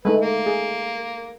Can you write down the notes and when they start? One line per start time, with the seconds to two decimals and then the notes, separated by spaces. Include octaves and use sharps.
0.05 G#3 A3 D#4 B4
0.21 A#3
0.46 G#4